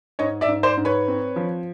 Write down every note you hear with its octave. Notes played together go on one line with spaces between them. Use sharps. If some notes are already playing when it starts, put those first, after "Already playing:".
G#2 C#5 D#5
D5 E5
G#2
C5 D5
G#2
B4 C#5
C4
F3